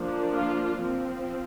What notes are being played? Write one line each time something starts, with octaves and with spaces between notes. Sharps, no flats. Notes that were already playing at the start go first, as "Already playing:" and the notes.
Already playing: F3 A#3 D4
F4
F3 C4